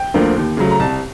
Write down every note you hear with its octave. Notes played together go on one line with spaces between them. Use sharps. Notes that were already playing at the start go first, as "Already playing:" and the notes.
Already playing: G5
D2 D3 F3 A#3
D#2
C#3 F#3 A3
A#5
C2 A5